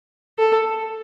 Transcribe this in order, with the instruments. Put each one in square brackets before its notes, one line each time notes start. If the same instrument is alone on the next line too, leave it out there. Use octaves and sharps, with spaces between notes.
[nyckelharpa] A4